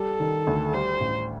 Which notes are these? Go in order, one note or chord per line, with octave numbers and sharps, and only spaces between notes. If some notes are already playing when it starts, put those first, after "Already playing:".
Already playing: G3 A4
D#3
D2
G3 C5
A1